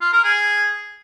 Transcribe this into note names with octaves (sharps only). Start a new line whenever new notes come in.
F4
A#4
G#4